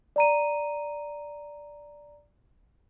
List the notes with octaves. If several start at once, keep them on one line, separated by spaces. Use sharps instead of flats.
D5 A#5 D#7